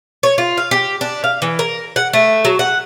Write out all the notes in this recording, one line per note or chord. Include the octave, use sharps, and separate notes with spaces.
C#5
F4
F5
G4
D4
F5
E3
A#4
F#5
A3
F#3
F#5